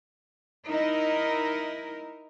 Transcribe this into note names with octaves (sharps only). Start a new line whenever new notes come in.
D#4 E4 A#4